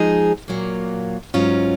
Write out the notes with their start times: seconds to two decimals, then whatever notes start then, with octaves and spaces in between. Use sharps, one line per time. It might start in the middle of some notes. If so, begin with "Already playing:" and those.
Already playing: F3 G#3 D#4 G#4
0.48 A#2 F#3 A#3
1.34 G#2 F#3 C#4 F4